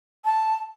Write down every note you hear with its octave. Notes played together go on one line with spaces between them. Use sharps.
A5